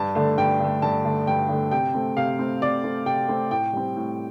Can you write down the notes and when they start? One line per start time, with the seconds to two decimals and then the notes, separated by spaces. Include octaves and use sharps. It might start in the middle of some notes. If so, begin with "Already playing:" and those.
Already playing: G2 A5
0.15 D3 A3
0.38 G2 G5
0.60 D3 A3
0.82 G2 A5
1.05 D3 A3
1.27 G2 G5
1.49 D3 A3
1.71 C3 G5
1.94 A3 C4
2.17 C3 F5
2.39 A3 C4
2.61 C3 D5
2.84 A3 C4
3.06 C3 G5
3.28 A3 C4
3.51 A2 G5
3.73 G3 C4
3.96 A2